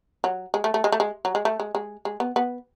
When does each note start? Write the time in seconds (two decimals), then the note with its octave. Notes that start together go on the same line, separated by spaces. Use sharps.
0.24 F#3
0.54 G#3
0.64 A3
0.74 A3
0.84 G#3
0.92 A3
1.00 G#3
1.25 F#3
1.35 G#3
1.45 A3
1.60 G#3
1.75 G#3
2.05 G#3
2.20 B3
2.36 B3